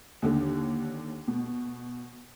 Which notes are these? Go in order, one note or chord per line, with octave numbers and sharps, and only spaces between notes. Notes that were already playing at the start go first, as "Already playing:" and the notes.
D#2 D3
B2